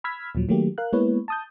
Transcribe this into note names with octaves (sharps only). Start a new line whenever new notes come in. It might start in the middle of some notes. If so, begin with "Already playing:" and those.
B5 E6 F6 G#6 B6
D#2 A#2 F3 F#3
D#3 F#3 A3 A#3 G4
A#4 F5 F#6
G#3 A#3 B3 E4 B4 C#5
A5 D#6 G6